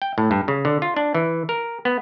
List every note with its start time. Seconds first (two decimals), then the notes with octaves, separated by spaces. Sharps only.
0.02 G5
0.18 A2
0.31 G2
0.48 C#3
0.65 D3
0.82 F4
0.97 D4
1.14 E3
1.49 A#4
1.85 B3